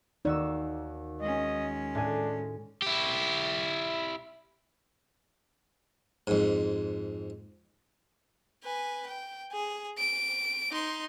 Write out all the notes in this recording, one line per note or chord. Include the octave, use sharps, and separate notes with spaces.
D#2 D#4 F#4 D5 E6
G#3 C#4 D#5
A2 D4 G#5
E4 G4
F2 G#2
B4 G#5
G5
G#4
D7
D#4 C6